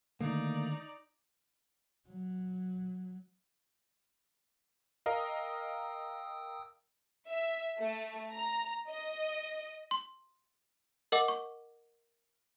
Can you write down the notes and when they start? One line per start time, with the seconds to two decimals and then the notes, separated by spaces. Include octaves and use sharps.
0.21 D3 D#3 A3 A#3 D#4 D5
2.08 F#3
5.06 A#4 D#5 F5 G5 D#6 E6
7.28 E5
7.79 A3
8.33 A#5
8.89 D#5
9.91 C6
11.12 A#4 D#5 F#5 D6
11.28 C#6